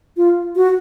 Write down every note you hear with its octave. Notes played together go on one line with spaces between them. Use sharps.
F4
F#4